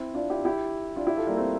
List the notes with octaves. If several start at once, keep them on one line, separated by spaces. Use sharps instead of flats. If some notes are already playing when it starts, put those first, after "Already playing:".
Already playing: C4 E4
D4 F4
E4 G4
E4 G4
D4 F4
E4 G4
F4 A4
G3 A#3
A3 C4